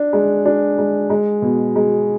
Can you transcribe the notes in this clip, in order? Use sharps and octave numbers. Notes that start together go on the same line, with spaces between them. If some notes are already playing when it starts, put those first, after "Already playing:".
Already playing: D4
G#3
D4
G#3
G#3
B2
G#3